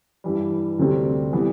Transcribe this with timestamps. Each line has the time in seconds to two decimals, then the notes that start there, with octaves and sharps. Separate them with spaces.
0.24 G2 E3 G3
0.79 D2 C3 G3 C4
1.33 E3 G3 B3